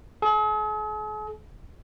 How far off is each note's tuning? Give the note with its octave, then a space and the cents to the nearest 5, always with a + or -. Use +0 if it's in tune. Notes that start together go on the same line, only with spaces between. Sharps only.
G#4 +45